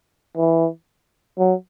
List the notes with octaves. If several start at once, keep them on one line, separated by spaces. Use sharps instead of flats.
E3
F#3